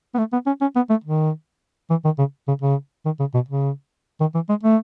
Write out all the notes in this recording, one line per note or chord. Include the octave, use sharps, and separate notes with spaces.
B3
A3
B3
C#4
C#4
B3
A3
D#3
E3
D#3
C#3
C#3
C#3
D#3
C#3
B2
C#3
D#3
E3
G#3
A3